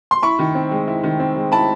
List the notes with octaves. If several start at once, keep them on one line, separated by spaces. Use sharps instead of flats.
C6
E4 B5 C#6
D#3
C4
G#3
E4
D#3
C4
G#3
E4 A5 B5